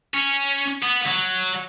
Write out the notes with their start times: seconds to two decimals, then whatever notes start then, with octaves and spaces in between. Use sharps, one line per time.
0.14 C#4
0.82 B3
1.06 F#3